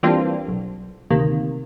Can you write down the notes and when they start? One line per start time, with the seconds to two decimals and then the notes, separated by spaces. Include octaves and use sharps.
0.03 E3 G3 A#3 C4 D4 F4
0.48 B1
1.10 D2 C3 D#3 A#3